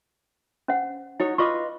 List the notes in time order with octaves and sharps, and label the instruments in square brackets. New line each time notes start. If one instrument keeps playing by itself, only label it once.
[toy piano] C#4 C5 F#5
[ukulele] D#4 F#4 C#5 [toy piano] E4
[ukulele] F4 B4 D#5 [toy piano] C#6 D6